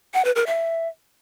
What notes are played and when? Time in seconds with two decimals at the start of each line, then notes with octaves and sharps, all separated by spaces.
0.14 F#5
0.25 B4
0.36 A#4
0.47 E5